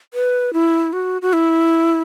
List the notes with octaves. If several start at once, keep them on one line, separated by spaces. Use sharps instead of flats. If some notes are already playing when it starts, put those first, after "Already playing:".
B4
E4
F#4
F#4
E4